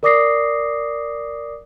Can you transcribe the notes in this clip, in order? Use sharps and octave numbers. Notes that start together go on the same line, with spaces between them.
A#4 D5 D6 D#6 A#6 C7